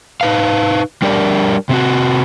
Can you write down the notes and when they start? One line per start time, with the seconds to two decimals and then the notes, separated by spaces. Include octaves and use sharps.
0.21 D#4 B4 F5
1.02 G3 D4 G4 A#4 D5
1.69 C3 C4 F#4